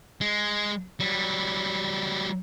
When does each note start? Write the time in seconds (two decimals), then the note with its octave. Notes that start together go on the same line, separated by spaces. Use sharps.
0.21 G#3
1.00 F#3 G3